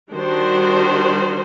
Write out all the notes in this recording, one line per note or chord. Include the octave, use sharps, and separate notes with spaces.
D#3 G3 D4 F#4 C5